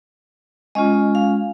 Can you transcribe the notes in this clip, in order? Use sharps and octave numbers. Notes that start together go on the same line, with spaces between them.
G#3 C#4 F4 D#5
F5